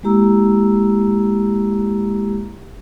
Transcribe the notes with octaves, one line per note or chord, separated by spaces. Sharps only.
G#3 A#3 E4 G4 A#5 E6